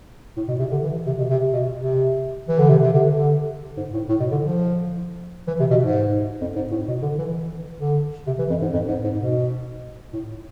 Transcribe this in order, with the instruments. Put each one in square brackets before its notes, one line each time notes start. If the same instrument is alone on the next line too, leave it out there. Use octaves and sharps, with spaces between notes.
[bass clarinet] A2
B2
C3
D3
E3
C3
B2
C3
B2
C3
E3
D3
C3
C3
D3
D3
G#2
A2
A2
B2
D3
F3
E3
C3
B2
G#2
F2
G#2
A2
B2
D3
E3
D3
C3
E3
F2
G#2
F2
G#2
G#2
B2
A2